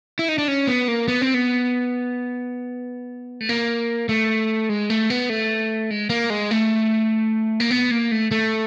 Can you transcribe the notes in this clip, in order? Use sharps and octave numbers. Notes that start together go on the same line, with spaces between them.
E4
D#4
D4
C#4
B3
A#3
B3
C4
B3
A3
A#3
A3
G#3
A3
B3
A3
G#3
A#3
G#3
A3
A#3
B3
A#3
A3
A3